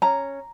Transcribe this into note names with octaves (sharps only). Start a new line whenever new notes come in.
C#4 A#5